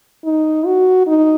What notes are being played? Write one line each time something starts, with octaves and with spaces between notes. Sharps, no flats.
D#4
F#4
D#4